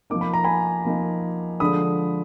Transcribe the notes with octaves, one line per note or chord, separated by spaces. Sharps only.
F3 A#3 D#4 D6
B5
A#5
G#5 B5
F3 A#3 D#4
D3 F3 G#3 D4 B5 D#6